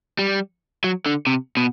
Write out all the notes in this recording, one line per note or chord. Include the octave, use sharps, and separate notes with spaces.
G3
F#3
D3
C3
B2